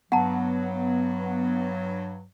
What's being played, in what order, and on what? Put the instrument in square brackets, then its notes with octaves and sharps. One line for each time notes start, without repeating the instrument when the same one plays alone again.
[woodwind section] G2 F#3 [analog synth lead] B3 [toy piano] F#5 A5 A#5